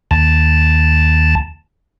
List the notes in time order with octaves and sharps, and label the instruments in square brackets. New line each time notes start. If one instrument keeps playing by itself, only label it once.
[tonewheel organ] D#2 A5